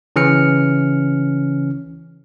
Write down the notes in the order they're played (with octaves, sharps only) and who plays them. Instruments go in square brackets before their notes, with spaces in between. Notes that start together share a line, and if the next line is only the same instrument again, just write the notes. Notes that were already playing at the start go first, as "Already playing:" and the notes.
[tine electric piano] C#3 E3 C#4 F6 C#7